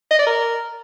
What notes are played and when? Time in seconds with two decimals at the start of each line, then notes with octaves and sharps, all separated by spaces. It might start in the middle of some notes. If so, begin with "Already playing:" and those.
0.11 D#5
0.19 D5
0.27 A#4